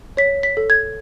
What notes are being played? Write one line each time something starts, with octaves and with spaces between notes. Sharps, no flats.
C#5 B6
B6
A4
G#6